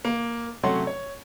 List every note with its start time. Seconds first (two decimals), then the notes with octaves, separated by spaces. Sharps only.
0.05 A#3
0.63 C3 F#3 A3 C#4 F#5 C6
0.87 C#5